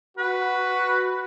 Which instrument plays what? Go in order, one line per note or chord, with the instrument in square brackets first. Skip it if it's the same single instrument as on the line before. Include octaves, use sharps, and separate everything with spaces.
[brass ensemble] F#4 [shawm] B4